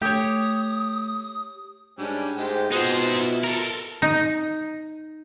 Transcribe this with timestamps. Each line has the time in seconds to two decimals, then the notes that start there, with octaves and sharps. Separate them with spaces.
0.02 A3 G4 C#5 D#6
1.99 G#2 G3 C#4 D4
2.37 G#2 G#3 A3 G4 C5
2.71 B2 C4 D#4 F4 G#4 C5 F#5
3.01 E4
3.44 A4 A#4
4.02 D#4